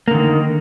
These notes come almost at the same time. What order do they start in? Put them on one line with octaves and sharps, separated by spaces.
A#3 D3 D#3